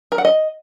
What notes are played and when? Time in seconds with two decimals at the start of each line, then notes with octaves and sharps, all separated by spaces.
0.12 A#4
0.18 F#5
0.25 D#5